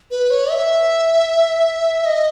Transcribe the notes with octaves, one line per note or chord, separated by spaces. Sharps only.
B4
C#5
E5
D#5